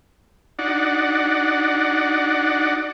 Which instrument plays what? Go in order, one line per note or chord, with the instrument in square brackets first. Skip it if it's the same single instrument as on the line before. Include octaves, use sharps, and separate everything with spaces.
[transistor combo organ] D4 D#4 F#4 D5 F#5